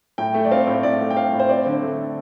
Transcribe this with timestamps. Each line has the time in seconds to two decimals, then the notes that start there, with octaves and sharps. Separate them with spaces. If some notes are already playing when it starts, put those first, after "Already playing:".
0.18 A2 G5
0.34 A3
0.45 D5
0.51 C4 F5
0.67 A2
0.83 A2 D5
1.01 A3
1.11 G5
1.17 C4 F5
1.33 A2
1.40 C5
1.49 C4 D5
1.66 D3
1.82 A3